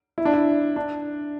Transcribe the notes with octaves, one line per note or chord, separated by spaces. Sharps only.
E4
D4
E4
D4